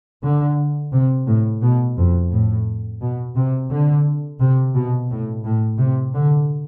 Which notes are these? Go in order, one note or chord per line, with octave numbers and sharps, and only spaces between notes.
D3
C3
A2
B2
F2
A2
B2
C3
D3
C3
B2
A2
A2
C3
D3